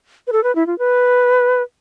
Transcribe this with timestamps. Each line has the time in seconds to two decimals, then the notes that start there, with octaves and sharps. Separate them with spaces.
0.27 B4
0.32 A4
0.44 B4
0.55 E4
0.67 F4
0.79 B4